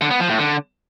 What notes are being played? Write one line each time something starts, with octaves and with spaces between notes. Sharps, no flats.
D3
B3
F3
A2
D3